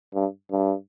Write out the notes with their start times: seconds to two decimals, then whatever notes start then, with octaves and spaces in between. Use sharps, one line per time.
0.14 G2
0.51 G2